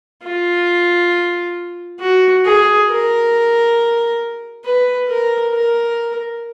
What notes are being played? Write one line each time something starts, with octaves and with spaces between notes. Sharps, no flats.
F4
F#4
G#4
A#4
B4
A#4
A#4